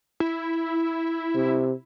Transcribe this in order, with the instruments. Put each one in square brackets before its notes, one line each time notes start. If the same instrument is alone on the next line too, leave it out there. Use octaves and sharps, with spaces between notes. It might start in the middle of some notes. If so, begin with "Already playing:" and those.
[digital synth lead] E4
[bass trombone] C3